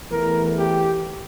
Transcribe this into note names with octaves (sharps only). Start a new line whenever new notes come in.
E2 E3 A3 A#4
G4